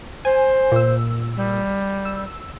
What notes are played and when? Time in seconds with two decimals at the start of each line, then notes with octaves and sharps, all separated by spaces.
0.25 C5 G#5
0.72 A#2 E6
1.37 G3
2.05 E6